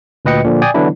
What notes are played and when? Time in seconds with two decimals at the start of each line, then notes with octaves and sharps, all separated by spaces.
0.25 D2 A#2 B4 D#5 G5 C#7
0.44 A#2 D3 F3
0.62 D5 G5 G#5 D#6
0.74 D3 E3 F#3 B3 D4 E4